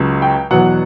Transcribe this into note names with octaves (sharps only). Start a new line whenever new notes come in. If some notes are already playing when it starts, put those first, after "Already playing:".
Already playing: C#2 C#3 F#3
G5
E2 B2 F#3 F#5